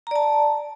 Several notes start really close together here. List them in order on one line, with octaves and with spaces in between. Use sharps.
A#5 D5 A5